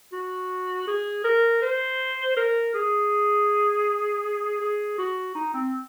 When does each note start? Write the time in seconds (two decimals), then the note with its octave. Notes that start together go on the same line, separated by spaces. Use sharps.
0.12 F#4
0.87 G#4
1.24 A#4
1.62 C5
2.36 A#4
2.74 G#4
4.60 G#4
4.98 F#4
5.35 D#4
5.54 C4